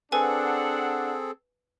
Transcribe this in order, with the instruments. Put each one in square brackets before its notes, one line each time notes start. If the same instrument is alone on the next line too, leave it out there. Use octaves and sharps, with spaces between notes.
[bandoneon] C4 G#4 A4 [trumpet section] D4 F#5 [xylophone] B4 G#5